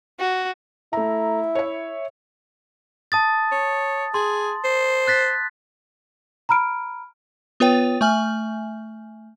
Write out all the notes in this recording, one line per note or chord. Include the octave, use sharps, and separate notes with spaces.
F#4
A3 E4 A#5
C#5 E5
A5 D#6 A6
C#5
G#4 C6
C5
F#6 A6 B6
A#5 B5 F6 D7
B3 F4 B4 C#5 G5
A3 E5 G#5 F6 F#7